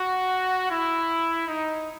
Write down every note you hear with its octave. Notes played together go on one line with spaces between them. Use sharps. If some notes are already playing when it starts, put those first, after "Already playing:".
Already playing: F#4
E4
D#4